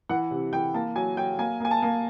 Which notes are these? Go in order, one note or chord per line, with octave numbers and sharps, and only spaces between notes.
E3 F#5
C3
E3 G5
A#3 A5
F#3 G#5
F#3 G5
A#3 G#5
A#3 G#5
A5
A#3